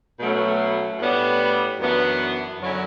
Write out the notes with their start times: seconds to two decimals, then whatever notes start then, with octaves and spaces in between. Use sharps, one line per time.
0.20 B2 F#3 A3 C#4
0.99 A2 G3 B3 D4
1.80 F#2 E3 B3 D4
2.59 F#2 D3 F#3 C#4 E4